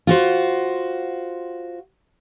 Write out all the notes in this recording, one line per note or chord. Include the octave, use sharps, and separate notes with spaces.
F4 F#4 C5